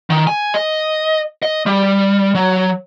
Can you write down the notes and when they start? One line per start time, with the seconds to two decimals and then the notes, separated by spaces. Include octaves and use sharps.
0.10 D#3
0.27 G#5
0.54 D#5
1.43 D#5
1.66 G3
2.35 F#3